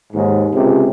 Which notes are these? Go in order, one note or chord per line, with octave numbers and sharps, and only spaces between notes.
D#2 G#2
C#2 C3